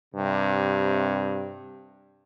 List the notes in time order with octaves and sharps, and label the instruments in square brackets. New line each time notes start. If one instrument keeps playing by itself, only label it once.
[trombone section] G2 C3